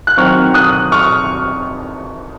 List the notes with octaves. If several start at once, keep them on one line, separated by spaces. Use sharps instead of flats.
F#6
D#3 F#3 C4 C#6 F6
D#6 F#6
C#6 F6